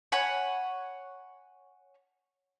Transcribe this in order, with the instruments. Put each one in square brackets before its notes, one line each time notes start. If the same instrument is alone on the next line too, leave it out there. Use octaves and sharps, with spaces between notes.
[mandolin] C#5 F#5 G#5 B5